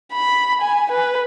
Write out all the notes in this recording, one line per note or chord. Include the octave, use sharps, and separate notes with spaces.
B5
G#5
B4